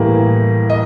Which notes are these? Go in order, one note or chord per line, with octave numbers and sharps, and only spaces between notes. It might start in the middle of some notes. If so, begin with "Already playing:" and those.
Already playing: A2 E3 G3 A#3
D#5